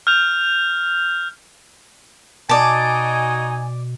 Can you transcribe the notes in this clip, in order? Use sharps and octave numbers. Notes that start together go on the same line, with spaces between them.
F6 G6 F7
B2 D#4 F#4 D5 D#5 G#5 A5